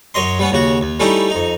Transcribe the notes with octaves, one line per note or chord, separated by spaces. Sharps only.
F#2 C#5 D#5 C6
G3 B3 C#4
D#2 C#3 F#4
D#2
G3 A3 C#4 D#4 E4 G4
F2 D#4